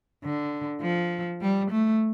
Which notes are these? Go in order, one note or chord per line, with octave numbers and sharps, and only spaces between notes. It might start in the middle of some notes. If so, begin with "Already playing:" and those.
D3
F3
G3
A3